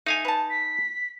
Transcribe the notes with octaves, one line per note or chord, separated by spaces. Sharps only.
A3 D#4 F5 G#5
B4 A5
B6